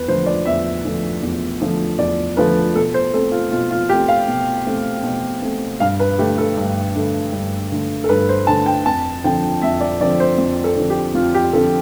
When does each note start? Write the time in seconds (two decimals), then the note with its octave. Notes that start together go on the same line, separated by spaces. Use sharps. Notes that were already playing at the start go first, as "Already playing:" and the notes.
Already playing: E2 B4
0.08 D3 F3 A3 C5
0.26 D5
0.45 E2 E5
0.84 D3 F3 A3
1.23 E2
1.61 D3 F3 A3
1.99 E2 D5
2.37 D3 F3 A3 B4
2.75 B2 A4
2.94 C5
3.13 A3 C4 A4
3.32 F4
3.51 B2 F4
3.71 F4
3.89 A3 C4 G4
4.08 F5
4.28 B2
4.66 A3 C4
5.03 B2
5.42 A3 C4
5.80 G2 F5
5.99 B4
6.18 D3 A3 G4
6.38 A4
6.57 G2
6.95 D3 A3
7.33 G2
7.72 D3 A3
8.04 A4
8.09 G2 B4
8.29 C5
8.47 D3 A3 A5
8.66 G5
8.86 F2 A5
9.24 D3 F3 C4 G5
9.62 F2 E5
9.81 D5
10.00 D3 F3 C4 D5
10.20 C5
10.38 F2
10.64 A4
10.76 D3 F3 C4
10.90 G4
11.14 F2 F4
11.34 G4
11.53 D3 F3 C4 A4